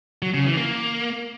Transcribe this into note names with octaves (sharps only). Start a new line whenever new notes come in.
F#3
C#3
E3
A#3